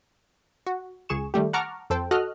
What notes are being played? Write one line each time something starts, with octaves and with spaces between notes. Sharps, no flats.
F#4
C#2 G#4 C#6 E7
D#3 G3 A3 G4
F#5 A5 A#5 C#6 D6 F6
F2 A4 C5 G5
F#4 A4 D#5 F6 F#6